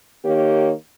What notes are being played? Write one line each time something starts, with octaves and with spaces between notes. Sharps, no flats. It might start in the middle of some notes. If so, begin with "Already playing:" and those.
D#3 A#3 G4 C#5